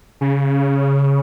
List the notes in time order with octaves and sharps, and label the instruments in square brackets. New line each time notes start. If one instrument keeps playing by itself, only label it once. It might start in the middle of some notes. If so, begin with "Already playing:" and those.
[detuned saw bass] C#3